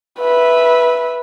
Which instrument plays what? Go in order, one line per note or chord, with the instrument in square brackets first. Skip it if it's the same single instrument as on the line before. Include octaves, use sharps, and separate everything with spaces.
[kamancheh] B4 E5